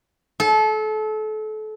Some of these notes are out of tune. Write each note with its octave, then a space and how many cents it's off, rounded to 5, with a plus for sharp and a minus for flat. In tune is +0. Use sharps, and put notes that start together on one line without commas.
A4 -30